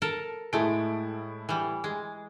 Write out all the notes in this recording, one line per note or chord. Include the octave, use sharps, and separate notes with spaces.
A4 A#4 A5
A2 G#3 A3 E4 D7
E3 G3
G#3